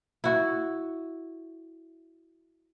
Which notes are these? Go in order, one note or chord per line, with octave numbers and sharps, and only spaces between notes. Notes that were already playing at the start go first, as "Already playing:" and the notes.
E4 F#4